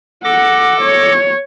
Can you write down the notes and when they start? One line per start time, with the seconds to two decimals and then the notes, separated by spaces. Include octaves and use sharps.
0.24 A4 F#5 D6 A#6
0.81 C#5